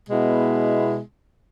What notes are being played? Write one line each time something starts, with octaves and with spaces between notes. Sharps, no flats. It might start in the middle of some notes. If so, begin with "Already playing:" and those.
B2 G#3 B3 E4